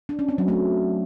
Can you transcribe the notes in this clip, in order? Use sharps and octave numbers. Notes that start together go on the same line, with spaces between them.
D4
C#4
C4
F#3
A3